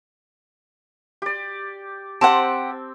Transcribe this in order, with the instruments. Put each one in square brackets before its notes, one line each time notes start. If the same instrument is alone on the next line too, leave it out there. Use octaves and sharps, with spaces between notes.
[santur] G4 D5
[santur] C4 [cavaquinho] G4 C5 F#5 [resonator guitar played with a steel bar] A5